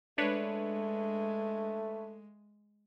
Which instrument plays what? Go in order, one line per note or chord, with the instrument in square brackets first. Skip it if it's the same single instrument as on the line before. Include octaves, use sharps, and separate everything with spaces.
[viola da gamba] G#3 [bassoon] A3 [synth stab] D4 B4 C#5